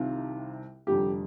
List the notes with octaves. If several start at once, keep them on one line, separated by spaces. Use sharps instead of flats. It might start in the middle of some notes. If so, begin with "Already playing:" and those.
Already playing: C2 C3 D#3 F4
F1 F2 D3 G3 G4